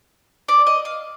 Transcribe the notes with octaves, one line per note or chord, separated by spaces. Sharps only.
D5
D#5
F5